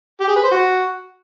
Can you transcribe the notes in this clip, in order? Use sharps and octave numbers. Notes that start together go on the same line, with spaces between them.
G4
G#4
B4
C5
F#4